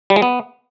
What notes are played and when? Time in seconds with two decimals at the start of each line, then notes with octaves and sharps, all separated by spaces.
0.10 G3
0.16 G#3
0.22 B3